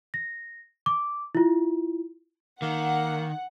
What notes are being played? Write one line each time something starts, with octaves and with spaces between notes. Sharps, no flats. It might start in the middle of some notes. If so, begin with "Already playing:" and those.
A#6
D6
E4 F4
D#3 A#3 F#5